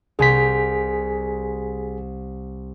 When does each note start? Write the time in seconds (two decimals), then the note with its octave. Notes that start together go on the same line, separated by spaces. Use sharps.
0.19 C2 G#4 G#5 C6 B6